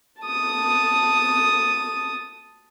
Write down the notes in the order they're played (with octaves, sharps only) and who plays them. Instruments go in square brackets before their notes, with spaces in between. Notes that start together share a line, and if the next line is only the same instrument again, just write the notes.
[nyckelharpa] A5 D#6